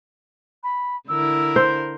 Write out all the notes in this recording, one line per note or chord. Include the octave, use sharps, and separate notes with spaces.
B5
D3 E4 A#4 E6
C5